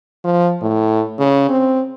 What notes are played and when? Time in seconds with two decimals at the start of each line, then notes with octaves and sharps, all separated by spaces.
0.24 F3
0.62 A2
1.19 C#3
1.49 C4